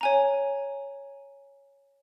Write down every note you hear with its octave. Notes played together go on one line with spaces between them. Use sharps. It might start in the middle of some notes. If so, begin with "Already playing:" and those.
C#5 G#5 A#5